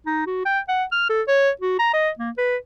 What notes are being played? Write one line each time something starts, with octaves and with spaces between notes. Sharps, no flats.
D#4
F#4
G5
F#5
F6
A4
C#5
F#4
A#5
D#5
A#3
B4